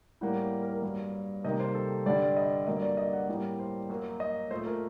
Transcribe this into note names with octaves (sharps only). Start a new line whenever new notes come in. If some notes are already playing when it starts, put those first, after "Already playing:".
A2 G3 A#3 F#5
A#4
A#4
G2 F#3 A#3
C3 D#3 G3 A#3 D#5
C5
A4
G2 D3 G3 D5
D#5
G2 D3 F#3 A#3 D#5
D5
D#5
F#5
A2 G3 A#3 D5
C5
F#2 F#3 A#3
D#5
A#2 A3 C5
A#4